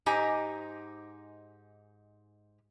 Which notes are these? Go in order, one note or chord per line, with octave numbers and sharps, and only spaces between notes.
G#2 D#4 G4 C5 G#5 A#5